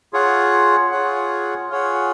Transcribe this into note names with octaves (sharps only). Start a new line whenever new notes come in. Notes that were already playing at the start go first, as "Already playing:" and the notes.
F4 G#4 C#5 F#5
F4 G#4 C#5 F#5
F4 G#4 C#5 F#5